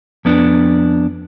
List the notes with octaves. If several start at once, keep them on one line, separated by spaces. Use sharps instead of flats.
F2 B3 D4